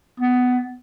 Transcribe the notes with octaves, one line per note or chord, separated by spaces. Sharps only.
B3